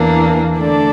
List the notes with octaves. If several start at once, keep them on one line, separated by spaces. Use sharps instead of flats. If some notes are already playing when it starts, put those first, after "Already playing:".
Already playing: E2 E3 A#3 D4
D3 A3 D4 A4 D5